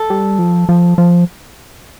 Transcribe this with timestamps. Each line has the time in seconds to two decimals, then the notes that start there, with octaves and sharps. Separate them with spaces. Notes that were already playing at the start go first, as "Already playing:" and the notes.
Already playing: A4
0.10 G3
0.39 F3
0.69 F3
0.98 F3